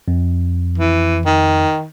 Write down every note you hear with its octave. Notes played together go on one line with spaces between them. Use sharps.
F2
E3
D#3